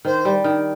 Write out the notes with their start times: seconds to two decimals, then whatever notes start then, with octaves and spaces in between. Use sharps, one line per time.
0.05 D#3 C5
0.25 G3
0.44 D#3